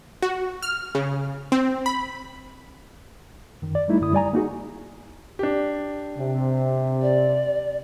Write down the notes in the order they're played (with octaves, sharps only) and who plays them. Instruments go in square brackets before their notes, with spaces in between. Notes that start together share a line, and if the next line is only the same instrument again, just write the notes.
[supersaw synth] F#4
F6
C#3
C4
B5
[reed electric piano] F#2 D#3
D5
G3 A3 D#4 E4
F#2 D3 E4 D#6
G3 D5 G#5 A#5
A#3 D#4 F#4 G#4
[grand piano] D4 G4
[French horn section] C3
[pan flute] D5